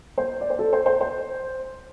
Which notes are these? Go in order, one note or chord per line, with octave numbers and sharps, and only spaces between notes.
C5
D5
C5
A4
C5
C5
C5